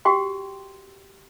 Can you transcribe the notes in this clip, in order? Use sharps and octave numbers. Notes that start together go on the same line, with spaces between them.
F#4 G4 G5 C6